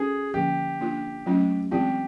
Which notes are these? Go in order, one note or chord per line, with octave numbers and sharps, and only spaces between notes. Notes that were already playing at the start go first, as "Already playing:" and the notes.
Already playing: C#4 F#4 G#4 A4
D3 F3 A#3 C#4 G4
A#3 D4 F4
F#3 A3 C#4 F4
E3 G#3 C4 F4 G4